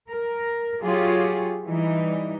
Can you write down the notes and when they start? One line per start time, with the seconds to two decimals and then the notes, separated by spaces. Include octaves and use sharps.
0.11 A#4
0.82 F#3 F4 G4 G#4 C#5
1.67 E3 G3 D#4